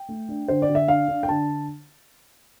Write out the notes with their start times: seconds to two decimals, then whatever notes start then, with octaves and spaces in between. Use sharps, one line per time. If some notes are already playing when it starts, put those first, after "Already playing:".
Already playing: G5
0.09 A3
0.29 D4
0.48 D3 C5
0.62 D5
0.69 D3
0.75 E5
0.88 D4 F5
1.08 D4
1.23 G5
1.28 D3 A5